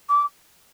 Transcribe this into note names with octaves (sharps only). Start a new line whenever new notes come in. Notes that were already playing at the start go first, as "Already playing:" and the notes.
D6